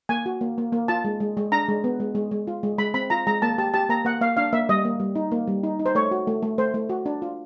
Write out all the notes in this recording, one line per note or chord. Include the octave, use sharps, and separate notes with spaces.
A#3 G#5
F#4
A#3
A#3
A#3
F4 A5
G#3
G#3
G#3
D4 A#5
G#3
B3
G#3
G#3
G#3
F4
G#3
G#3 B5
C4 B5
F4 A#5
G#3 A#5
A#3 A5
G4 A5
G4 A5
A#3 A#5
A#3 F#5
A#3 F5
D4 F5
A#3 E5
G3 D#5
A#3
G3
D#4
A#3
G3
D#4
D#4
C5
A3 C#5
F#4
A3
A3
A3 C5
A3
F#4
D4
F4